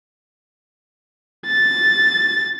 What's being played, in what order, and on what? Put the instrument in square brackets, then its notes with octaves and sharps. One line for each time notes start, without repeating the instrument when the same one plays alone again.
[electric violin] A6